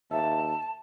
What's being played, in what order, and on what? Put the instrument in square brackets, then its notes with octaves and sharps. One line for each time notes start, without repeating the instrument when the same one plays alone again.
[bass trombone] D#2 [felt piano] E5 [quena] A5